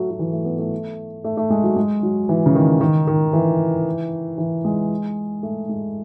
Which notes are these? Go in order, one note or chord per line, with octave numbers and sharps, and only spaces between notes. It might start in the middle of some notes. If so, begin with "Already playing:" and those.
Already playing: F#3 A3
F#3
E3
A3
B3
A3
A3
A3
G#3
F#3
G#3
F#3
E3
C#3
D#3
D#3
D#3
E3
E3
G#3
A3
G#3